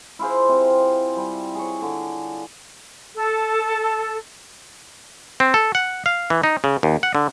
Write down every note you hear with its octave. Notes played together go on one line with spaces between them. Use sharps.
E4 F4 G#4 C5
C3
G3
G#4 C#5
D3
A4
C4
A4
F#5
F5
E3
D#4
C#3
D#2
F#5
D3